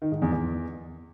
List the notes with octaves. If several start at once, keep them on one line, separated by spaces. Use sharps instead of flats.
D#3
G#2
E2
E2